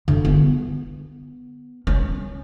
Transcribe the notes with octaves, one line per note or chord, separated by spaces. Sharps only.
D3
B3
C#4